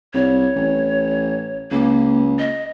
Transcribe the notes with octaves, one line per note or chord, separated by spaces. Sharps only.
C2 C#5
A1
C#2 A#3
D#5